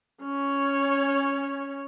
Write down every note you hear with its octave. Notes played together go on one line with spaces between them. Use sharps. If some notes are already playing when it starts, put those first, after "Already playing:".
C#4 C#5